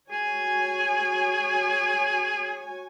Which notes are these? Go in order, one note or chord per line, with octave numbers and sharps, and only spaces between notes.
F#4 G#4 C#5 G#5